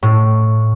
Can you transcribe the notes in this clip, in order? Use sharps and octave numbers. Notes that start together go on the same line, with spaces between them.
A2